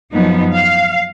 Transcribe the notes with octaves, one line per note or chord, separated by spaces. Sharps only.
F#2 F3 B3 D#4
F5